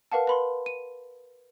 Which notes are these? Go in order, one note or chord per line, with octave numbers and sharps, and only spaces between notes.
A#4 B4 F5 F#5 A5
B4 B5 C6
D#7